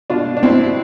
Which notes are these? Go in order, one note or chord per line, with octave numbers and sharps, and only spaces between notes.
B2 D4 F4
B2
D4
B2 C4 E4
B2